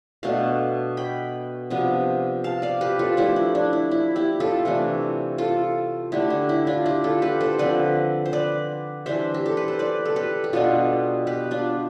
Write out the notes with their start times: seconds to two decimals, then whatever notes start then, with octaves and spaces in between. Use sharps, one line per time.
0.23 B2 A3 D4 F5 A5
0.97 G5 B5
1.70 C3 F3 B3 D4
2.44 F5 A5
2.62 D5 F5
2.81 G4 B4
2.99 F4 A4
3.17 F3 A3 D4 E4 G4
3.36 E4
3.55 D4
3.73 E4
3.91 E4
4.16 E4 G4
4.40 F4 A4
4.65 C3 E3 A3 D4
5.38 F4 A4
6.12 D3 A3 D4 E4 G4
6.30 D4
6.49 E4
6.67 D4 F4
6.86 E4 G4
7.04 F4 A4
7.22 G4 B4
7.41 A4 C5
7.59 D3 F3 C4 B4 D5
8.26 C5
8.33 B4 D5
9.06 E3 G3 D4 C5 E5
9.34 G4
9.46 A4
9.57 B4
9.68 C5
9.79 B4 D5
10.06 A4
10.16 G4 B4
10.44 G4
10.53 B2 G3 B3 D4 F4 A4
11.27 G4 B4
11.51 D4 F4